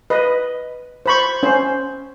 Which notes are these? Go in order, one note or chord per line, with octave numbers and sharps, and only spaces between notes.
B4 D#5
C5 B5 C#6
C#4 C5